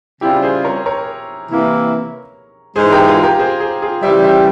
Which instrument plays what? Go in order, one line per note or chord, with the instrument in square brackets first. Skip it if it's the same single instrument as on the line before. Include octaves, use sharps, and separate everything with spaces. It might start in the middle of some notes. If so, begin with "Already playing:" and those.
[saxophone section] C#3 G3 C4 F4 [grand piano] E4 G4
[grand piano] G#4 C5
A#4 C#5
A#4 C#5
[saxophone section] C3 E3 A#3 E4
[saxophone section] G#2 E3 G#3 [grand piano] G#4 C5
[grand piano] G4 A#4
F4 G#4
G4 A#4
G#4 C5
G#4 C5
F4 G#4
[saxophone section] C#3 E3 G3 [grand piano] C5 E5
[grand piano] C5 E5